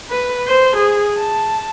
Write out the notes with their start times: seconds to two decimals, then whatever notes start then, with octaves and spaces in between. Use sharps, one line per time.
0.10 B4
0.47 C5
0.76 G#4
1.17 A5